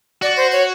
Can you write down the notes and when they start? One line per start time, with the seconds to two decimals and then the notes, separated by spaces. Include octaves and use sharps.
0.22 F#4 D5
0.37 C5
0.52 C#5